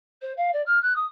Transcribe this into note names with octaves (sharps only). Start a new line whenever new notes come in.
C5
F5
D5
F6
F#6
D#6